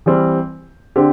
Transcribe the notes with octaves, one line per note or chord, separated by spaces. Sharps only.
E3 G3 C4
D3 C4 G4 C5